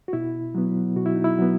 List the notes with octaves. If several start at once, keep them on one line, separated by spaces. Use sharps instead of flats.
F#4
B2 E4
F#3 B3
B2 F#4
E4
D#4
E4
F#3 B3